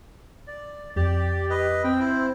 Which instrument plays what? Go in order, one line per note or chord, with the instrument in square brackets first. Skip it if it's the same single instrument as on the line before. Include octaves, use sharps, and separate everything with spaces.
[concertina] D5
[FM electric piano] F2 [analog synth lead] G4 [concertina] D5
[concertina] B4 D#5
[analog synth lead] C4 [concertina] G5
[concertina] E4 C5